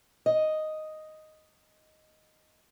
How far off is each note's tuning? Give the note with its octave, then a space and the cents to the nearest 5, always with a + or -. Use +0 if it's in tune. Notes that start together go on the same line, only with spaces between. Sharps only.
D#5 +0